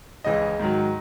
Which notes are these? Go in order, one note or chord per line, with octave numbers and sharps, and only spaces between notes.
C#2 C#3 E3 D#5
G#2 D#3 F#3